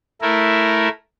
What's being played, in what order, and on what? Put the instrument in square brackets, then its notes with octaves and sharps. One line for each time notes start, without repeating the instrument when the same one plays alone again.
[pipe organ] A3 E4 A#4